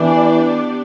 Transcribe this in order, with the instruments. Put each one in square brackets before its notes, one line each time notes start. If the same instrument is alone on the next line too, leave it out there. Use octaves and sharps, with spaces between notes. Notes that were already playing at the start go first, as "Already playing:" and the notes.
Already playing: [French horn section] E3 [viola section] B3 D4 G4 D5